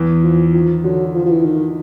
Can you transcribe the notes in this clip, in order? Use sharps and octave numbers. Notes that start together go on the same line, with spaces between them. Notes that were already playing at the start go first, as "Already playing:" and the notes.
Already playing: E2 E3
F3
D#3 F3
D3 F#3
F3
F3
E3
D#3